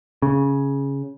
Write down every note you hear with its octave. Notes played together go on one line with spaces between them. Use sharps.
C#3